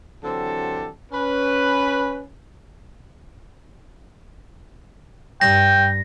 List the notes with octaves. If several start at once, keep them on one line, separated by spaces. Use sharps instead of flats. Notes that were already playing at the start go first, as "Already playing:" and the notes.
D3 E3 F#3 C4 G4 A4
C#4 B4
G2 G5 A#6